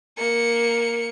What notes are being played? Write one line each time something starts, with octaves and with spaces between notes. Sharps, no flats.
A#3 C#7